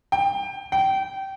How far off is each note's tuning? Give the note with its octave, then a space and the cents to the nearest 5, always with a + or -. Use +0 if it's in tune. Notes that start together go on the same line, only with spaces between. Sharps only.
G5 +25
G5 -20